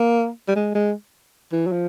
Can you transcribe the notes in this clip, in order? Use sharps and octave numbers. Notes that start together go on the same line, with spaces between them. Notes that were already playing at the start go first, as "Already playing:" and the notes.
Already playing: A#3
G3
G#3
G#3
E3
F#3
F3